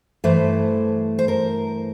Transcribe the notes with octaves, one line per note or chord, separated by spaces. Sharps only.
G2 E3 A3 C5
C5
A#4